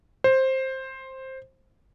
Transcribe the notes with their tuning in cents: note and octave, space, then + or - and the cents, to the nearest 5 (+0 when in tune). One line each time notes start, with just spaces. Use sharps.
C5 +10